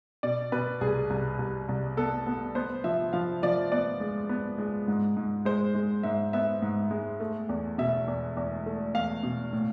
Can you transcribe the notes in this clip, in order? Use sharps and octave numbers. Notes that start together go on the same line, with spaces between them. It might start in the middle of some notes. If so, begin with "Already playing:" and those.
B2 D5
B2 B4
C2 G#4
C2
C2
C2
B3 A4
B3
B3 C5
F3 E5
F3 F5
F3 D5
B3 D5
G#3
B3
G#3
G#2
G#2
G#3 C5
G#3
G#2 E5
B3 E5
G#2
G#3
A3
E2
B2 E5
E2
E2
A3
E2 F5
B2
A2